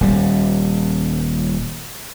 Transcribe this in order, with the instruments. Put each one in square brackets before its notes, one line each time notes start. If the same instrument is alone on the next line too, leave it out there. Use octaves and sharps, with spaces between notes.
[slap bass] D#1 G3